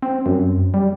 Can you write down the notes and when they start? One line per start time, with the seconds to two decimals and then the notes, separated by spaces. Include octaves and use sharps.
0.02 C4
0.26 F#2
0.74 G3